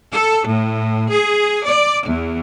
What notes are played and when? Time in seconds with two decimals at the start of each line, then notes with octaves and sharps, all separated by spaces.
0.13 A4
0.47 A2
1.11 G#4
1.65 D5
2.09 E2